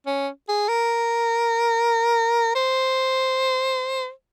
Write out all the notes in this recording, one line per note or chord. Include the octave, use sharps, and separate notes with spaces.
C#4
G#4
A#4
C5